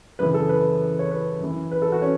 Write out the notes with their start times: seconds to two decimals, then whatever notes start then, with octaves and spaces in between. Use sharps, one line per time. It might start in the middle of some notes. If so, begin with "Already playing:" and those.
0.19 F#2 C#3 E3 B4
0.34 A4
0.49 B4
0.99 C#5
1.11 B4
1.40 F#2 E3
1.71 B4
1.82 A4
1.92 F#4
2.02 C#4